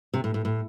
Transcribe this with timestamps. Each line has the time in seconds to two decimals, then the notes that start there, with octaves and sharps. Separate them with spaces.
0.13 C3
0.24 A2
0.34 A2
0.45 A2